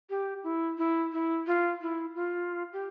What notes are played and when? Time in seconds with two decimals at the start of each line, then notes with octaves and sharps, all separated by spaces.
0.10 G4
0.44 E4
0.78 E4
1.12 E4
1.47 F4
1.82 E4
2.15 F4
2.73 G4